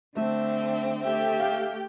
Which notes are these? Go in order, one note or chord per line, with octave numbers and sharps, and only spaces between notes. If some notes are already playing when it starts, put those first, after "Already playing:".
D3 A3 C4 E5
A3 G4 E5 G5
F5